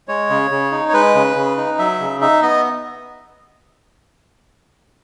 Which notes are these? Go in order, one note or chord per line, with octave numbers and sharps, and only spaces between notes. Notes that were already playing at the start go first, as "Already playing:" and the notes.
G#3 C#5
C#3
C#3
D#4
C#5
G#3 B4
C#3
C#3
D#4
F#3 E5
C#3
D#4 E5
B3 D#5